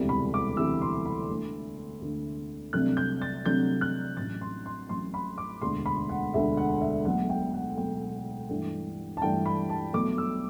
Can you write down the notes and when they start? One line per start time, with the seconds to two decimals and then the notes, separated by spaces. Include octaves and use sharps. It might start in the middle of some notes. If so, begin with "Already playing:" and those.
Already playing: E1 D2 C3 E3 G3
0.09 B5
0.34 D6
0.57 E1 D2 C3 E3 G3 E6
0.82 C6
1.06 B5
1.30 D2 D3 A3
2.02 D2 D3 A3
2.73 C2 C3 F#3 A3 D4 F#6
2.97 G6
3.22 A6
3.45 C2 C3 F#3 A3 D4 G6
3.81 F#6
4.17 A1 A2 F#3 A6
4.41 C6
4.66 C6
4.89 A1 A2 F#3 C6
5.14 B5
5.38 D6
5.62 E1 D2 D3 C6
5.86 B5
6.09 F#5
6.33 E1 D2 D3 E5
6.57 F#5
6.81 E5
7.05 B1 B2 F#3 A3 F#5
7.30 G5
7.54 F#5
7.77 B1 B2 F#3 A3 G5
8.49 G2 E3 A3 D4
9.17 A5
9.21 G2 E3 A3 D4 G5
9.46 B5
9.70 A5
9.93 B1 B2 F#3 A3 D6
10.18 E6